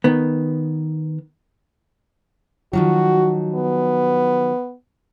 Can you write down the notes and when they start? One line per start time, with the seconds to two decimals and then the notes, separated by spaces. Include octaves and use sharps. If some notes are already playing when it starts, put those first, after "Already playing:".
0.04 D#3 B3
2.73 D#3 F3 F#3 F#4
3.55 B3